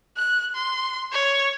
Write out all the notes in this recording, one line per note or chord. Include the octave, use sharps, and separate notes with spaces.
F#6
C6
C#5